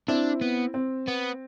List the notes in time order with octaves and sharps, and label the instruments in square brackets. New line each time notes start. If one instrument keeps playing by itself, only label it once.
[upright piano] C4 E4 [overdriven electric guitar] D4
[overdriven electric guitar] B3
[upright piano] C4
[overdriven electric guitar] B3